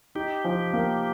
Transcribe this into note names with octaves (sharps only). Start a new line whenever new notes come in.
D#4 G4
F3
A#3